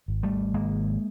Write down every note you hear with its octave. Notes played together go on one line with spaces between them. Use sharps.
G#1
G3 A3
G#1 G#3 A#3